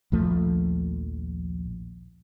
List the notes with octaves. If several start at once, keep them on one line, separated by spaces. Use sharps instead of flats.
A#1 D#2 F3 A3